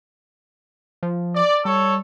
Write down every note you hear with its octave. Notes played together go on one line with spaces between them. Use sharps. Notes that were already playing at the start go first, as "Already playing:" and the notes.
F3
D5
G3 A4 C#5